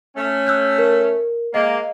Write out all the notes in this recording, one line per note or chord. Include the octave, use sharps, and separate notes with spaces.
A3 C#4
E6 F#6 G6
A#4
G#3 A#3 D#5 F5